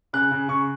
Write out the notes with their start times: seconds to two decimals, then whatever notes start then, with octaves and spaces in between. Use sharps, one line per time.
0.13 C#3 F#6
0.31 C#3
0.48 C#3 C#6